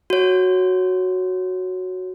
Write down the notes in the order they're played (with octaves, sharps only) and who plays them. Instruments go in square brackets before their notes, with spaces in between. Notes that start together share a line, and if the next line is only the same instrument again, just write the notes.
[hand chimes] F#4 C#5